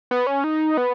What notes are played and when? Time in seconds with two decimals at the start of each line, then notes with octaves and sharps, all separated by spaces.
0.11 B3
0.27 C#4
0.44 D#4
0.77 B3